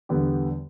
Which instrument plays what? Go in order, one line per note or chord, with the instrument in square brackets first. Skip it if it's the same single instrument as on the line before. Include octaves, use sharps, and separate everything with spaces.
[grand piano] E2 D3 G3 B3 G4